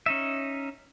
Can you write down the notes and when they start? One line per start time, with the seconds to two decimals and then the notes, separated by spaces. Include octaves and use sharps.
0.06 C#4 D#4 E5